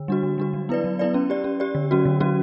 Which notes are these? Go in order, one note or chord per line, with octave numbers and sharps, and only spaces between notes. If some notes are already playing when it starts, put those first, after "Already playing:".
Already playing: D3
G3 D4 F#4
D3
G3 D4 F#4
F#3
B3 E4 B4 D5
F#3
B3 E4 B4 D5
C#4
G4 D5
C#4
G4 D5
D3
F#3 C#4 F#4
D3
F#3 C#4 F#4